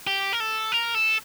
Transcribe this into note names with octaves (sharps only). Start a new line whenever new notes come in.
G4
A#4
A4
A#4
A4